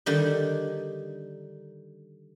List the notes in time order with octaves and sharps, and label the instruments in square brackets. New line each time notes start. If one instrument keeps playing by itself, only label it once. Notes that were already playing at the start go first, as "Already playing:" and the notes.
[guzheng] D3 D#3 G3